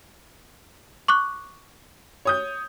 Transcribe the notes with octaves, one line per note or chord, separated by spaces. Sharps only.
C#6 D6 F#6
C#5 D#6 G6